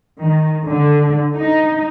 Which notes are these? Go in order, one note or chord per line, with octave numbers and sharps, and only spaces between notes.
D#3
D3
D#4